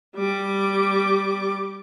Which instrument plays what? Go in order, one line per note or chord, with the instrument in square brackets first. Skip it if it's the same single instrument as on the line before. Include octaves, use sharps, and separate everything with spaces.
[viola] G3 D6